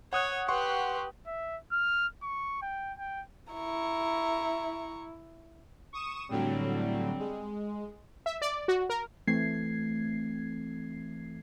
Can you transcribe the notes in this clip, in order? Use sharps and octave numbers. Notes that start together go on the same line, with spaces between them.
C#5 F#5 D#6 F#6
G4 B4 F#5 C6 C#6
E5
F6
C#6
G5
G5
E4 A#5 C#6
C#6 D#6 E7
A2 D3 F#3 G3 C4
G#3
E5
D5
F#4
A#4
E3 A3 C4 G#6 C7